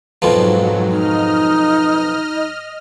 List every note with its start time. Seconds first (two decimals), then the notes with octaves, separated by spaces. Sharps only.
0.22 F2 G#2 B2 F3 F#3
0.89 D#4 D#5 F6